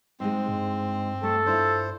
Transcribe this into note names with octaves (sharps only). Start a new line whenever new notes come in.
G#2 G#3 C4
G2
A3 A4
D4 E4 F4 C5